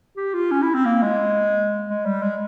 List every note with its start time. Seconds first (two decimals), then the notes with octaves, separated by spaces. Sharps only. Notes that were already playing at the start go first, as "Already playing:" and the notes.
0.17 G4
0.34 F4
0.51 C#4
0.63 E4
0.74 C4
0.85 A#3
1.02 G#3
1.88 G#3
2.05 G3
2.22 G#3